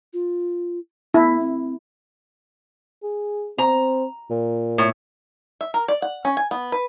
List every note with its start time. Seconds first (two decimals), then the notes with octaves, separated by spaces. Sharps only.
0.13 F4
1.14 B3 E4
1.40 C4
3.03 G#4
3.58 C4 A#5
4.30 A#2
4.78 A2
5.61 E5
5.74 A#4
5.88 D5
6.02 F#5
6.25 C#4
6.37 G#5
6.51 B3
6.72 B4